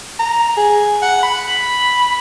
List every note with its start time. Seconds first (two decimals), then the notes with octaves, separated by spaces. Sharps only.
0.19 A#5
0.57 G#4
1.02 F#5
1.23 B5